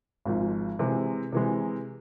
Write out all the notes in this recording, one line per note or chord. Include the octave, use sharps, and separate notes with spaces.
G#1 G#2 F3
C3 E3 G#3
C3 E3 G#3